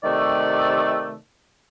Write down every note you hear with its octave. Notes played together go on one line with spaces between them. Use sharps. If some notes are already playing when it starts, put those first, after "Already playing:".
C3 D#3 A3 D5